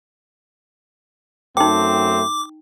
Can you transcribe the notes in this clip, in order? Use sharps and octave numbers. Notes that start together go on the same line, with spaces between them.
F#2 A3 C4 D#4 G5 D6